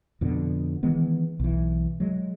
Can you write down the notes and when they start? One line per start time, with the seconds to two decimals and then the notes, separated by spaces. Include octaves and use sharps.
0.21 F2 B2 D3
0.83 D#3 E3 G#3 B3
1.39 B1 E3
2.00 F#3 G#3